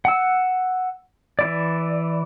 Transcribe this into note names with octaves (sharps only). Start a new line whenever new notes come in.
F#5 E6
E3 E4 D5